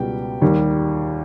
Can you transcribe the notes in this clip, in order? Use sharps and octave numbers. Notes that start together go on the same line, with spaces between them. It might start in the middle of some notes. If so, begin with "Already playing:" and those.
Already playing: C#2 B2 G3 G4 G5
D#2 D#3 G3